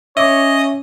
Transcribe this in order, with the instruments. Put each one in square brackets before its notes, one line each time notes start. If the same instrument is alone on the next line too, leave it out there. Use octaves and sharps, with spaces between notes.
[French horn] C#4 [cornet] C#5 [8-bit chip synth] D#5 [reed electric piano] E5 D6